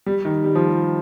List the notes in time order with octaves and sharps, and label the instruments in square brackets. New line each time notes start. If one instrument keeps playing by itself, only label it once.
[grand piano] G3
D#3
G3
F3
G3